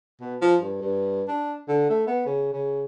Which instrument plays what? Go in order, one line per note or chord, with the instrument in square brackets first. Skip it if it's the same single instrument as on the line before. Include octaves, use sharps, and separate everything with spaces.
[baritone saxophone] B2
F3
G2
G2
D4
D3
A3
B3
C#3
C#3